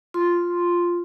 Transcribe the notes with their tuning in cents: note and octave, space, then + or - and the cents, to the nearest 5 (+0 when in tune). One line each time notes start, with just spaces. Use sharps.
F4 +0 C6 +0